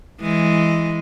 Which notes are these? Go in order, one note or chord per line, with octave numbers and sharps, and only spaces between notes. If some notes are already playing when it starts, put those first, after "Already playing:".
E3 G#3